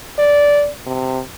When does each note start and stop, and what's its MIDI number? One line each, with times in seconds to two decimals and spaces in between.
0.19 0.69 74
0.87 1.20 48